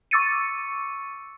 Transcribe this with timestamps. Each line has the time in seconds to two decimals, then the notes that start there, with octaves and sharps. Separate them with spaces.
0.11 C#6 D6 E6 A6 C#7 D#7